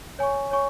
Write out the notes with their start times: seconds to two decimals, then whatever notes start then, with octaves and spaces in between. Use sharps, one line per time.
0.19 C#5 G#5 C#6
0.51 C#5 G#5 C#6